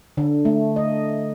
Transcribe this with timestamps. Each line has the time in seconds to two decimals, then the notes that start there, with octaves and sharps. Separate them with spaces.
0.17 D3
0.45 A3
0.76 D#5